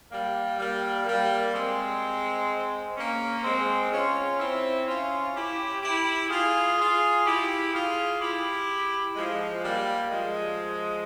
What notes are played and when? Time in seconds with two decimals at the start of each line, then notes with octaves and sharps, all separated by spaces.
0.11 G3 A#3
0.59 G3 A#3
1.07 G3 A#3
1.54 G#3 C4
2.97 A#3 C#4
3.44 G#3 C4
3.92 C#4 F4
4.39 C4 E4
4.87 C#4 F4
5.35 E4 G4
5.82 E4 G4
6.30 F4 G#4
6.78 F4 G#4
7.26 E4 G4
7.73 F4 G#4
8.20 E4 G4
9.16 F3 G#3
9.63 G3 A#3
10.11 F3 G#3